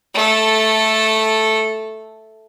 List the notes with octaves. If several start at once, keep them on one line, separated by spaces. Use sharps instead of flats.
A3 A4